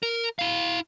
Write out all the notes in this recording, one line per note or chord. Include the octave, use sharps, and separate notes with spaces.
A#4
E4 F5